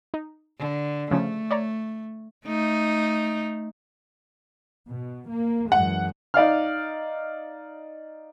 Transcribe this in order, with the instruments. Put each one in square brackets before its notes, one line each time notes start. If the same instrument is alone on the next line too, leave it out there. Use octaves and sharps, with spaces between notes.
[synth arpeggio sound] D#4
[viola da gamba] D3
[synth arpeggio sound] C#3 F3 C#4 [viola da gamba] A3
[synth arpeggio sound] C#5 D5 A#5
[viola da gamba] A3 D#4
[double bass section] B2
A#3
[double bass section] F#2 E3 G#3 [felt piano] F#5
[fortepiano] D#4 D5 F5 F6